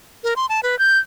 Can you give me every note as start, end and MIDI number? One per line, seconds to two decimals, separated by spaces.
0.24 0.34 70
0.36 0.46 84
0.49 0.60 81
0.63 0.78 71
0.79 0.98 91